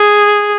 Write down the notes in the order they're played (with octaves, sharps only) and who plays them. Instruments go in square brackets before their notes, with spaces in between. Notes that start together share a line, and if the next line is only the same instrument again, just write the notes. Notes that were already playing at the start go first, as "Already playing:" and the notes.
Already playing: [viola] G#4